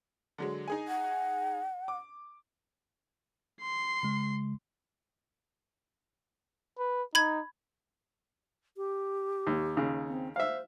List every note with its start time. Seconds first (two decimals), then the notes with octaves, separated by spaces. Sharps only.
0.38 D3 F#3 G#3
0.68 D#4 G#4 G#5
0.88 F#5
1.88 D6
3.61 C6 C7
4.03 C#3 G#3
6.78 B4
7.15 D#4 B5 G#6
8.77 G4
9.47 D#2
9.77 D#2 C#3
10.09 C4
10.36 C5 E5 F5